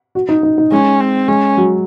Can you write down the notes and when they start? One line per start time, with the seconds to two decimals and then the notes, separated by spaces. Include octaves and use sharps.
0.15 F#4
0.29 D#4
0.43 D#4
0.58 D#4
0.72 G#3 C#4
1.00 C4
1.28 G#3 C#4
1.57 F#3